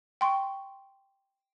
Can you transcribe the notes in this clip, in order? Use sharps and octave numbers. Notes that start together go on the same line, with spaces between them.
G5 C6 C#6